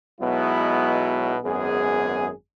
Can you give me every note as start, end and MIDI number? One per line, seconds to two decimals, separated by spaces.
0.21 1.37 35
0.21 1.37 47
0.21 1.37 54
0.21 1.37 56
0.21 1.37 59
0.21 1.37 64
1.45 2.30 32
1.45 2.30 42
1.45 2.30 59
1.45 2.30 68